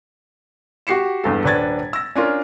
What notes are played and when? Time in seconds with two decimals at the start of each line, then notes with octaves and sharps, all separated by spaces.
0.87 F#4 G4 C7 C#7 E7
1.24 E2 G2 A4
1.44 D#1 D4 B4 G#6 A6
1.93 E6 A#6
2.15 C#4 D4 F4 A#4